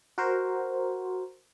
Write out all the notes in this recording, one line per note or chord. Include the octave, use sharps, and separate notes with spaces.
F#4 A#4 C5